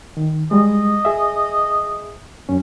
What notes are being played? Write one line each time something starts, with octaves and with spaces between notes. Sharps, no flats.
D#3
G3 G#3 D#5
G#4 E5
F#2 C#4